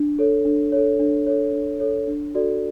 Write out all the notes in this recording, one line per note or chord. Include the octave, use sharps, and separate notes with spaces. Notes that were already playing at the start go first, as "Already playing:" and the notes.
Already playing: D4
A4 C#5
D4
A4 C#5
D4
A4 C#5
D4
A4 C#5
D4
F#4 A4 D5